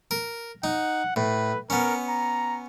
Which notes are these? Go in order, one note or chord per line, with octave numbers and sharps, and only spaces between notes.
A#4
D#4 F#5
A2 B4
B3 C#4 A#4
A#5